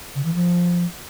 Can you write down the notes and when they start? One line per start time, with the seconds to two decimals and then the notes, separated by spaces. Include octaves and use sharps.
0.15 C#3
0.25 E3
0.34 F3